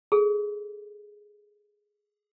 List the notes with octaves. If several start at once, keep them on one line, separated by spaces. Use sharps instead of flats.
G#4 A4